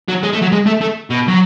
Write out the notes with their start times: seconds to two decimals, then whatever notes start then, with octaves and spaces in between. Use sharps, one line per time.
0.08 F#3
0.23 G#3
0.33 A3
0.42 F#3
0.52 G#3
0.66 A3
0.81 A3
1.10 B2
1.28 F#3